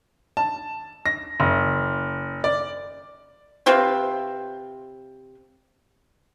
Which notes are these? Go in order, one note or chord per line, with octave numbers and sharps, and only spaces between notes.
A5
A#6
F#1
D5
C3 C4 F4 B4